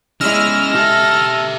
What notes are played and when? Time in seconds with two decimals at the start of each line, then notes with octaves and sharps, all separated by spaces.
0.21 G#3 C#4 E4 D5 E6 F6 A#6
0.75 G4 A4 E5